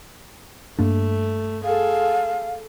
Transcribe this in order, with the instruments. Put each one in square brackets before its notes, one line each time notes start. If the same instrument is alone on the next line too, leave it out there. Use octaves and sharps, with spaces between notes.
[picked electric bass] G2 A#3 D4 [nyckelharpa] A3
[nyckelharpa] G#4 A4 [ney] F5